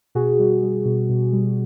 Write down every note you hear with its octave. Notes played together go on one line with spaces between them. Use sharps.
B2 F#4 G#4
G3
G3
B2
B2
G3